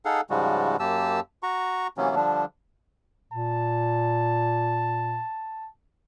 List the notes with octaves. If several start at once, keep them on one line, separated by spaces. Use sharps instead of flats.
D#4 G#4 A4 F5 F#5
G#2 C#3 F3 G3 G#3 F#4
F#2 A#3 G4 A5 E6
F#4 A#5 C#6
C3 E3 F#3 A#3 B3 C#4
D3 F3 G3 D4
A#2 A5